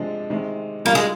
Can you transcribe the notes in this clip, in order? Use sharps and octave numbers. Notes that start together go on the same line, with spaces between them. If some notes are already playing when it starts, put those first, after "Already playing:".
Already playing: C3 F3 G#3 D4
C3 D#3 G#3
G3 A#3 D4 F4
G#3